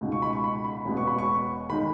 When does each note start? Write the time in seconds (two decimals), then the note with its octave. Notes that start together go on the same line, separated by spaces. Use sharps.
0.01 C#2 B2 G#3 D#4
0.12 C#6
0.22 B5
0.33 C#6
0.44 B5
0.64 B5
0.85 E1 E2 B2 G#3 B3
0.97 C#6
1.07 B5
1.19 C#6
1.69 D#3 G#3 D#4 B5